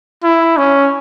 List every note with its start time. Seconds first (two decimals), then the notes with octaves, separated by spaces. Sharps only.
0.24 E4
0.57 C#4